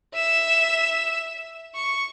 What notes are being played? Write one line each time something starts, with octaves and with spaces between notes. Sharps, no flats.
E5 E7
C#6